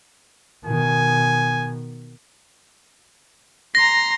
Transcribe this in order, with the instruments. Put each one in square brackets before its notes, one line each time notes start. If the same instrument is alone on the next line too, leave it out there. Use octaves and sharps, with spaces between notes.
[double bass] B2 D#3 [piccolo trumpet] G#5
[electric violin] A#5 C6 [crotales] A#6